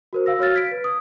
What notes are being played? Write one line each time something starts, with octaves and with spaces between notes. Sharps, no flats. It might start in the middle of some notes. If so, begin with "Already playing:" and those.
F#4 A#4 C5
F5 E6 A#6
F#4 C#5 F5 F6 A6
G#6 B6 D7
B4
D#6